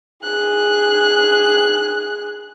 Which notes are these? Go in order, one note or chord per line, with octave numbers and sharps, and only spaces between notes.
G#4 F#6